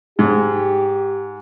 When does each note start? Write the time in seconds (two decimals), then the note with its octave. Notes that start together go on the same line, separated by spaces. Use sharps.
0.19 G#2 G4